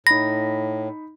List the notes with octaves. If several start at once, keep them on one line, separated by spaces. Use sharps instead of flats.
A2 D#4 B5 A#6